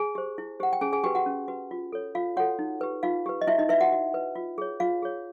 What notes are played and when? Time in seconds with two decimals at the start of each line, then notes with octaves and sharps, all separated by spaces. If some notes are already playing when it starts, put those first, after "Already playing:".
Already playing: G#4 G#5
0.15 G4 C5
0.38 E4
0.60 G4 C5 F#5
0.73 G5
0.81 C#4 G#4 G#5
0.93 G#4 G#5
1.04 F#4 G4 B4 G5
1.15 F#4 F#5
1.26 C#4
1.48 F#4 B4
1.71 F4
1.92 A4 C#5
2.15 F4 F5
2.37 F#4 A4 C#5 F#5
2.59 D#4
2.81 G4 B4
3.03 D#4 F4 F5
3.26 G4 B4
3.41 D#5
3.47 E4 F#4 E5
3.58 D#4 D#5
3.69 E4 B4 E5
3.81 F#4 F#5
3.92 F#4
4.14 B4
4.35 F4
4.58 G#4 C#5
4.80 F4 F5
5.03 G#4 C#5